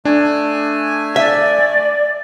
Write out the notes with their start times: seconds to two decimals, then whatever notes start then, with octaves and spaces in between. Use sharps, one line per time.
0.05 A3 D4 G#5
1.16 D5 E5